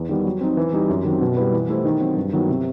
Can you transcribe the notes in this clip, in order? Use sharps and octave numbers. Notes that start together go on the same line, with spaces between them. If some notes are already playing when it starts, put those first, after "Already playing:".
Already playing: E2
D#3 G3 B3
F#3
C4 D#4
E3
G3 D#4 G4
F#2
D#3 F#3 C4
B2
G3 B3 E4 B4
E3
A3 E4 G4 C5
D#3
F#3 C4 F#4
G2
D#3 F#3 B3 E4
C3